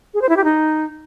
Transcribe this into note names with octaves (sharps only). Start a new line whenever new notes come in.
G#4
C5
E4
G4
D#4